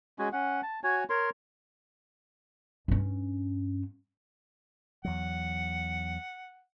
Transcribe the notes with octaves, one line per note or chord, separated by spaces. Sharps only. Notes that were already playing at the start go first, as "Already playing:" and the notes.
G#3 C#4 F#4 G#5
C#4 F#5
A5
F#4 C#5 G#5
A#4 C#5 C6
G2 C#4
E2 F#3 F#5